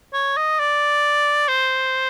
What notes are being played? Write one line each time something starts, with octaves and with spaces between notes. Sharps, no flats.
C#5
D#5
D5
C5